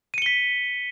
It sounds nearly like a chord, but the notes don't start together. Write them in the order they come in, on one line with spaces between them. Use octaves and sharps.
D#7 C#7 G7 B6